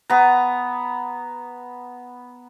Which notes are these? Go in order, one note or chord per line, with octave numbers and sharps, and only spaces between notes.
B3 A#5